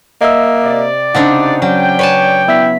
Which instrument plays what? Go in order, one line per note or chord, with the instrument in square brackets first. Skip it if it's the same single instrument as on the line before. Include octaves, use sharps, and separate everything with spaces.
[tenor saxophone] A#3 [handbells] D#5 E5 E6
[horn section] C3 D5
[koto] C#3 C4 D4 [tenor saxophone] D#4 [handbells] F#5
[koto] F#3 [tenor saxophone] C#4 [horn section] D5 G5
[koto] B4 G#5 A5 [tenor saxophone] C#5
[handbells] B3 E5 B6 [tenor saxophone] E4